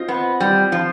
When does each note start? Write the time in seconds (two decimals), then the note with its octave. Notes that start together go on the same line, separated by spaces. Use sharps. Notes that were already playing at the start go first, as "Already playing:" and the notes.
Already playing: C4 F4 C5 D#5
0.08 B3
0.40 G3
0.72 F3